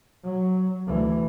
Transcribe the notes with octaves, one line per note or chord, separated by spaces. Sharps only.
F#3
D2 E3